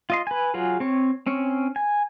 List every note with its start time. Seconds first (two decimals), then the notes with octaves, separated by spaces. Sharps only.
0.10 F4 D#5 C6
0.27 B4 G#5
0.54 F#3 F4 G#4
0.80 C4 C#5
1.26 C4 C#4 C#5
1.76 G#5